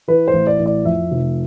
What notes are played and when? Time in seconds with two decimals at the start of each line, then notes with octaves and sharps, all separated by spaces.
0.08 E3 B4
0.28 C5
0.34 A1
0.47 D5
0.59 A1
0.66 D5
0.85 F2 E5
1.12 F1